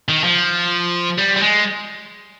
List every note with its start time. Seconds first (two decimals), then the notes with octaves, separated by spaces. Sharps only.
0.08 D#3
0.24 F3
1.18 G3
1.36 G3
1.41 G#3